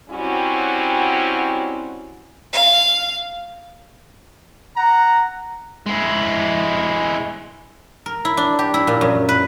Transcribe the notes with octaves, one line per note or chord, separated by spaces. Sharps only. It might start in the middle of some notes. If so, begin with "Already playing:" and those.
F#3 G3 C4 C#4 E4 F#4
F5
F#5 A#5
G#3 E4
A#4
E4
D4
G4
E4
A#2
F#2
B4